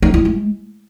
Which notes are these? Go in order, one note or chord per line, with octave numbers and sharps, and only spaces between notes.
D#4
E4
G#3